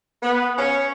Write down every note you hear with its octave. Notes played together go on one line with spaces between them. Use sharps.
B3
C#4